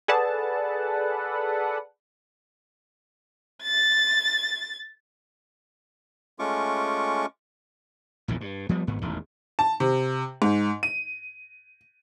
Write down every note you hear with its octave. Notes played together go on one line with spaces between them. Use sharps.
G#4 A4 B4 D5 F#5 A5
A6
G#3 A3 C#4 F4 C#6 D6
A#1 E2 A#2 D#3
G2
F3 G3 B3
G#1 G#2 B3
E1 A1 E2 D#3
A5
C3
G#2
D#7